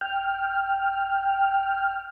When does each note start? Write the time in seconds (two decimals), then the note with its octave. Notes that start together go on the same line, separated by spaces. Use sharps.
0.01 G5 F6